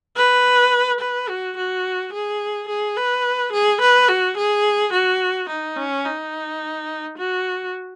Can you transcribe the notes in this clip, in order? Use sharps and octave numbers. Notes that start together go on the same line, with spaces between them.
B4
B4
F#4
F#4
G#4
G#4
B4
G#4
B4
F#4
G#4
F#4
D#4
C#4
D#4
F#4